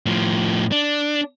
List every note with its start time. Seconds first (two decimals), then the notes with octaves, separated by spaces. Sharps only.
0.06 A2 F3
0.72 D4